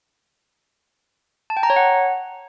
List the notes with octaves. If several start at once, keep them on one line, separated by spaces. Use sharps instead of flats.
A5
G5
A#5
C#5
F#5